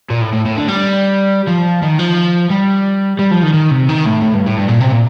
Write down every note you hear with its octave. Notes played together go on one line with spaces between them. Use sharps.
A#2
A2
A2
A2
D3
G3
F3
D#3
F3
G3
G3
F3
D#3
D#3
C3
D#3
A2
A2
G2
A2
G2
A#2
C3
A#2